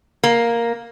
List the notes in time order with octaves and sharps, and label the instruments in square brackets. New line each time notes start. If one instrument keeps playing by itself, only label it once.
[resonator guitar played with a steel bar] A#3